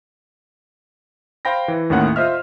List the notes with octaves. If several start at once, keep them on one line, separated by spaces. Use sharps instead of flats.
C5 F5 G5 B5 A#6
E3
D#2 A2 D#3 C#4 F#5
F4 C5 D#5 E5 F6